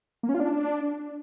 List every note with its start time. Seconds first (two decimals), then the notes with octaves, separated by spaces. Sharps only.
0.23 A#3
0.29 C#4
0.34 F4
0.40 D4